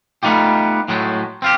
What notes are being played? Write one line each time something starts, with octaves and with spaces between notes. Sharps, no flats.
G3 A3 B3 D#4 F4 G4
A2 F#3 G#3 A3
C4 F4 G4